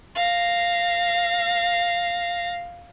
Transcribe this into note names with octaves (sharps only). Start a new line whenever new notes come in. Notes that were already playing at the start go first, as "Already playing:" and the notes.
F5 A#6